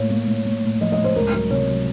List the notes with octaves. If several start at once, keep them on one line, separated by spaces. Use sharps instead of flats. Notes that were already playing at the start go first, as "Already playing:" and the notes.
Already playing: A2 A#3 C#5
A#3
A2
A#3
A2
F3 D#5
D#5
A2
C5
C#2 A#4
F#3 A#4
C3 C#5
F#3